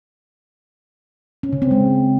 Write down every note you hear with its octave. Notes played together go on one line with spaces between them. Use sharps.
C#4
C#3
C4
G#3